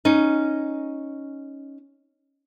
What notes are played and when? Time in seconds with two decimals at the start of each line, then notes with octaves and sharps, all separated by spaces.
0.05 C#4 D#4